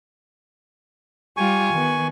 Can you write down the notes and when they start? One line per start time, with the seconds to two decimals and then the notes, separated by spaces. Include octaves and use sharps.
1.37 G3 F4 G4 G#5 C#6
1.72 D#3 B3